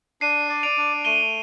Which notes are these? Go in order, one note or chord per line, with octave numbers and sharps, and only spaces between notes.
D4 C7 D#7
D5
D7 F7
D4
A3 D#7 G7